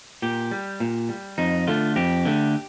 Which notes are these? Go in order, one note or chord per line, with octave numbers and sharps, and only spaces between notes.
A#2 G4
G3
A#2
G3
F2 D#4
D3 A3 F4
F2 G4
D3 A3